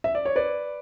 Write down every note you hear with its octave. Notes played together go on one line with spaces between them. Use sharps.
E5
D5
C#5
B4 D5